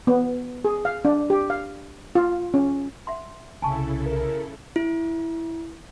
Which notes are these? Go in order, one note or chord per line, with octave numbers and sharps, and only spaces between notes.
B3
G#4
F5
D4
G4
F5
F4
C#4
E5 F#5 C6
C2 C#3 E4 A4 G#5 A5 C#6
A#4
E4